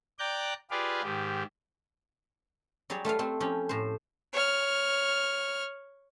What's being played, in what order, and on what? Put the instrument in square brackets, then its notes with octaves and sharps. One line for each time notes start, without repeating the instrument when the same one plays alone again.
[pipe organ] D5 G5 A#5 D6 F#6 G6
F4 G4 G#4 B4 D5 F5
G#2 D#3 G4
[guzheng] F#3 G3 G#4 C#5 D5
A3 F4 B4 F5
A3 C4
F3 C#4 E4 G4
A2 C5
[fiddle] C#5 F6